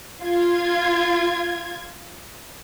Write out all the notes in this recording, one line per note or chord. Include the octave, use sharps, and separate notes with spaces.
F4 G#6